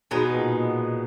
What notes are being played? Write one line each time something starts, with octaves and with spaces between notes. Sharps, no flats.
B2 G#3 B3 D#4
A#2